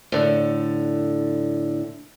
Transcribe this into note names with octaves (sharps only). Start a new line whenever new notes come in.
A2 D3